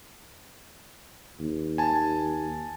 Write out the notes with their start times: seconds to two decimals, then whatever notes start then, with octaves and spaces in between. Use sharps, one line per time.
1.40 D#2
1.78 G#5 A5